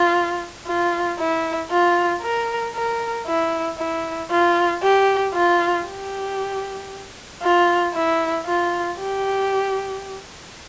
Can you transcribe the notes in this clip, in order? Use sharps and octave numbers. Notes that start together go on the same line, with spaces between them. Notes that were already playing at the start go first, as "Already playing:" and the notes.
Already playing: F4
F4
E4
F4
A#4
A#4
E4
E4
F4
G4
F4
G4
F4
E4
F4
G4